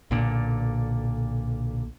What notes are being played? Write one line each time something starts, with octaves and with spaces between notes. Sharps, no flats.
B1 A#2 D3